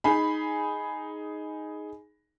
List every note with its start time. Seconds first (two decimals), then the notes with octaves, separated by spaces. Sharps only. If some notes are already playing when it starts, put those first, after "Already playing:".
0.04 D#4 G#4 B5